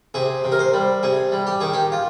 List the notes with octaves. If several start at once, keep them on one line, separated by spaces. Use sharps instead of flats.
C3 G#4
C3
A#4
C5
G3
C3 G#4
G3
G4
D#3 G#4
G4
F4